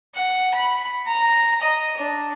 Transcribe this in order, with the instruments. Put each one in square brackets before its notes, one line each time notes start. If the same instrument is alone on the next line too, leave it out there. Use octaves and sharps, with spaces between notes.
[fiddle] F#5
B5
A#5
D#5
D4